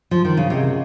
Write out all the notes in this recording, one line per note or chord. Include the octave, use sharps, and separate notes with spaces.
F3
D#3
C#3
C3 C#4 G#4 D#5 F#5